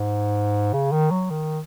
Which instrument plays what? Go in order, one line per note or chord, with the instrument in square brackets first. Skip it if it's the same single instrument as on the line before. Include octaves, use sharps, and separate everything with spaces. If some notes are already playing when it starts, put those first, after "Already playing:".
Already playing: [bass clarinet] G#2
C#3
D#3
F#3
D#3